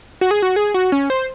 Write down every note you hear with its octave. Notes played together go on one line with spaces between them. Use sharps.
F#4
G#4
F#4
G#4
F#4
C#4
C5